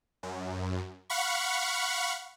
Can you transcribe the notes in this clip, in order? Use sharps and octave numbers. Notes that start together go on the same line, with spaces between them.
F#2
F5 F#5 B5 C#6